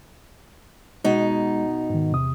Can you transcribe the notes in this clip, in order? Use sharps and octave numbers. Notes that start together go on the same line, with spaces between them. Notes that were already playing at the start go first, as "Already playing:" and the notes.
B2 G#3 D#4
G#2 D#3
E2 C3 D#6